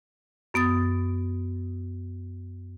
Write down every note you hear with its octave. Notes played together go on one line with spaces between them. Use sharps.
F#2 B3 D#6 A6